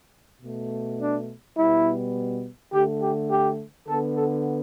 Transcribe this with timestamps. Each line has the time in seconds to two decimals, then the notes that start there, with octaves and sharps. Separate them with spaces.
0.42 B2 A3
0.99 D4
1.57 B2 G3 B3 E4
2.72 D3 A3 G4
3.01 G4
3.30 G4
3.88 D3 B3 A4
4.16 A4